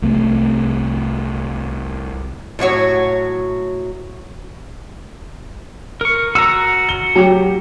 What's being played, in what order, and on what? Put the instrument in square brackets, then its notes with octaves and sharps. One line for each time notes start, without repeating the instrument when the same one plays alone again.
[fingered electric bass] C2 A3 C4
[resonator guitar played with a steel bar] A2 F#3 F#4 C#5
[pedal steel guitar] A#4 C#6
[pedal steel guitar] F#4 A#5 [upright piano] E6
[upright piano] G7
F#3 G4